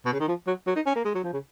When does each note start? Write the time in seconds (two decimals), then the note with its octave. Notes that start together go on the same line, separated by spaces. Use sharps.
0.05 B2
0.13 C#3
0.20 D#3
0.28 F3
0.47 F#3
0.67 F#3
0.75 D#4
0.86 C#4
0.95 A#3
1.05 G#3
1.15 F#3
1.24 F3
1.33 C#3